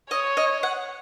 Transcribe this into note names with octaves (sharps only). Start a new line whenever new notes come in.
C#5 D#5
D#5
F#5